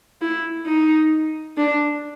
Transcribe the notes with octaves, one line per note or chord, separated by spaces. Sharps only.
E4
D#4
D4